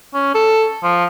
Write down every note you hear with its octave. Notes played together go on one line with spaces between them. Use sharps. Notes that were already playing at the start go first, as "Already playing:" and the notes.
C#4
A4
F3